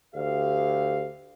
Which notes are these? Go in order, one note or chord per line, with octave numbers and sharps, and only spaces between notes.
D2 G4 F5